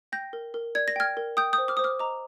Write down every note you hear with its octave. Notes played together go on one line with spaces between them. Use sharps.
G5 G6 A#6
A#4
A#4
D5 G#6
A#6
G5 F6 G#6
A#4
G5 D#6 G6
D#6 G6
C5
D6 F6
C5 D#6
D6 F6
D#5 A#5 D6